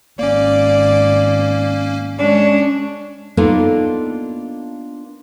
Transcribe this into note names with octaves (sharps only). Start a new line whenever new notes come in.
G#1 A#3 C#4 D5
G#3 C#4 D4
A#3 B3 D4 D#4 F4 A4